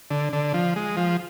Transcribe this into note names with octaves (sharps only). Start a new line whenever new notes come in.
D3
D3
F3
G#3
F3